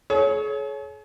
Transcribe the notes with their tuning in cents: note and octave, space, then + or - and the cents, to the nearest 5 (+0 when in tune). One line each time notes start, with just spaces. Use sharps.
G#4 +45 C#5 +0